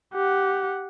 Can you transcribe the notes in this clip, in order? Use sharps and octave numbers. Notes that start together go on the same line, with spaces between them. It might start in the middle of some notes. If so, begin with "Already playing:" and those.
G4 F#5